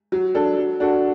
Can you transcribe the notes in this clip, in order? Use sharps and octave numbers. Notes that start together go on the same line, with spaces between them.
F#3
D4 A4
F#3
D4 F#4 A4